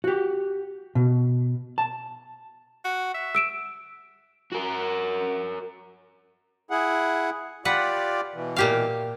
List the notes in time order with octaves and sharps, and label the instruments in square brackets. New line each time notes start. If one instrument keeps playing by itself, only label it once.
[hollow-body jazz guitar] F#4 G4
B2
A5
[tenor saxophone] F#4
E5
[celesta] E6 D7 E7
[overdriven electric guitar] F#4 A#4
[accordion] E4 G#4 F#5
[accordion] F4 G4 D5 [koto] B4 F#5
[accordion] B2 E3
[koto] A#2 G4 F5